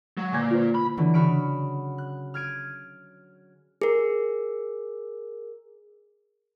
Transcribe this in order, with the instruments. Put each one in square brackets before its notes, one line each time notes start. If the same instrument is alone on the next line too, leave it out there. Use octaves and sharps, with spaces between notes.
[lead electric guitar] F#3 [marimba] G#3
[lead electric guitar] A#2 [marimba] D3 G#5 G#6
[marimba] F4 B4 C5
[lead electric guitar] B5
[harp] D3 E3 F#3
C#3 F#4 B5 F6 D7
F#6
F6 G#6 D7 D#7
[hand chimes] G#4 A#4